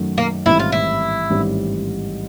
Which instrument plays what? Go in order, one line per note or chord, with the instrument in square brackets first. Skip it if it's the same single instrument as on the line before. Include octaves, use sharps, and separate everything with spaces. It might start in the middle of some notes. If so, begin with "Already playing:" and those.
Already playing: [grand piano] F#2 D#3 F#3 A3
[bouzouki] A#3
[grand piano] A1 G#2 D#3 G3 C4 [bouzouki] E4
[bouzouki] F4
E4
[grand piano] A1 G#2 D#3 G3 C4